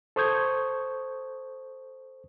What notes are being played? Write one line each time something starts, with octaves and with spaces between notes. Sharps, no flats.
A4 C5 C#6 D#6 G6 G#6